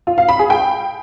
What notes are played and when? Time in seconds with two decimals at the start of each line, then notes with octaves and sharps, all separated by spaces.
0.07 F4
0.18 F5
0.28 B5
0.39 G#4
0.50 G5